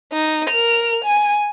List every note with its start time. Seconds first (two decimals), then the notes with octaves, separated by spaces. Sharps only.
0.12 D#4
0.50 A#4 F7
1.04 G#5